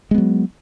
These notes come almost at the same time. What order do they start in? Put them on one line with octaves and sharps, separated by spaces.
G#3 B3 F#3